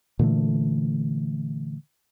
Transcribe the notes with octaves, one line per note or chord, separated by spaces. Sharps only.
A#2 D3 E3 A3